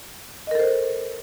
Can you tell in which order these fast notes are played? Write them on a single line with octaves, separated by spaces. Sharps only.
D#5 A#4 A4 C5